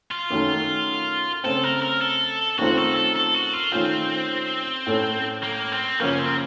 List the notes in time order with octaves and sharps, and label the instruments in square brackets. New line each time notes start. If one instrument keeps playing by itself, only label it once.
[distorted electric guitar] F4
[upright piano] F#2 D#3 F#3 A3 C#4
[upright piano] C#3 A3 C4 [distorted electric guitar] A4
[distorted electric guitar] A#4
A#4
A4
[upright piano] F#2 D#3 A3 C4 F4 [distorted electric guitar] F#4
[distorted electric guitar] A4
A4
A4
F#4
F4
[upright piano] D#3 A3 C#4 F4 [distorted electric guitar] C4
[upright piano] A2 A3 C#4 A4
[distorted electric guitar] A#3
C4
[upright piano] F#2 C#3 F3 A#3 [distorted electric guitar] C#4
[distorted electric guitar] C4